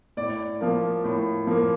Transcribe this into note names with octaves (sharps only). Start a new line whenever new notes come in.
A2 D5
F3 A#3
A2
F3 A#3